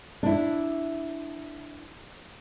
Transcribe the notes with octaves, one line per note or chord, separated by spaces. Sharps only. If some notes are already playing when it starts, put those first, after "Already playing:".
D4 E4